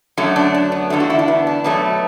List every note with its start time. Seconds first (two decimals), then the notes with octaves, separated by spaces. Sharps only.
0.17 F#2 D3 F#3 A3
0.36 D4
0.54 D4
0.72 B3
0.90 E2 D3 A3 D4
1.00 F#4
1.10 E4
1.19 D4
1.28 B3
1.47 D4
1.64 B2 F#3 A3 B3